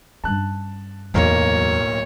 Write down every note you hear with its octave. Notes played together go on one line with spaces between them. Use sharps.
G2 C#4 A5 F#6
D1 B1 E2 C3 A#3 C#5